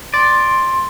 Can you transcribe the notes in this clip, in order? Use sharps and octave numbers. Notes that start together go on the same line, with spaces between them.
D5 C6